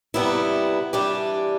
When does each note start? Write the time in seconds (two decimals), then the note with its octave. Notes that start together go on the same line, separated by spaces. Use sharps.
0.14 C3 G3 B3 E4
0.93 E3 G3 D4 G4